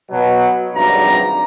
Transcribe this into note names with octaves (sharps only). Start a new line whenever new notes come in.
B2 F#3
G#1 G2 C3 F#3 D5 A#5